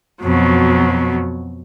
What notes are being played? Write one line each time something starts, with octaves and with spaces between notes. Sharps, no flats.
F2 B2 F#3